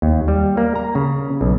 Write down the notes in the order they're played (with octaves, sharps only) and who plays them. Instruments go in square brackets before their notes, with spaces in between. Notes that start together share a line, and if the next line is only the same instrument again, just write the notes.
[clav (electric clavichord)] D#2
G3
A#3
A#5
C#3
B1